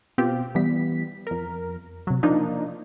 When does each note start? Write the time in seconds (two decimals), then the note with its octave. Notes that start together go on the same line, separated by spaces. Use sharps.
0.18 B2 C4 F4 G4
0.55 E3 G3 B3 B6
1.27 F2 A#4
2.07 C3 F#3
2.23 F3 A#3 D4 D#4